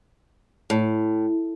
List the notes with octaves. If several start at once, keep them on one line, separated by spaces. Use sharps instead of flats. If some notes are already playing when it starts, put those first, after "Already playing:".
A2